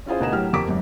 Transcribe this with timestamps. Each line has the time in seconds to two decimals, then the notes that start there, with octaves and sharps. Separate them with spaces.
0.06 C#4 E4 F4 G#4 C5
0.20 D2 B2 G#4 A#4 D#5 E7
0.32 A2 F#3 G4 F6
0.53 F2 G4 A#4 D6 B6
0.68 G#1 F#2